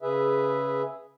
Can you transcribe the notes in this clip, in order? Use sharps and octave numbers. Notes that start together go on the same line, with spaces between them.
C#3 G#4 B4 E5